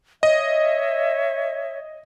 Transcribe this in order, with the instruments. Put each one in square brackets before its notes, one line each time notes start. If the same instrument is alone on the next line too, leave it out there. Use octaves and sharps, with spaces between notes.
[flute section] C#5 E5 [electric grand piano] D#5